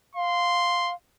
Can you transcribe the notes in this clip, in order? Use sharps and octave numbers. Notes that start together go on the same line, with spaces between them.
F5 C6